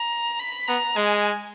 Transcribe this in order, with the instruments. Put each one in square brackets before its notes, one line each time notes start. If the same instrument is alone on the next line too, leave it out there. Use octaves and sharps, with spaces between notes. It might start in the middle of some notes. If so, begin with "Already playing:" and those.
Already playing: [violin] A#5
B5
[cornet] B3 [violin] A#5
[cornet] G#3 [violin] G#5